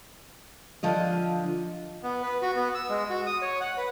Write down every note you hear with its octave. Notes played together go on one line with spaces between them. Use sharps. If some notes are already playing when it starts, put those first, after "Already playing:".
D3 F3 F4 D#5
B3
B4
F#4
B3
E6
G#3
F#4
D#6
C#5
F#5
B4